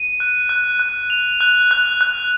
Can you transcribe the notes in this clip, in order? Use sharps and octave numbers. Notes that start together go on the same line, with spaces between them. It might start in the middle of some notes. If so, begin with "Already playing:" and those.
Already playing: D#7
F#6
F#6
F#6
F7
F#6
F#6
F#6